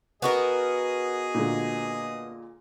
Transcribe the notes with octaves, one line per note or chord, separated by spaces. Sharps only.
B3 F#4 G#4 A#4 D#5
A#2 D3 G#3